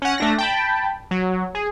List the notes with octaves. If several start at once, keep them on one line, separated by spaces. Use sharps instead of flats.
C#4 F#5
A3 D4 A#6
G5 A5 B5
F#3
G#4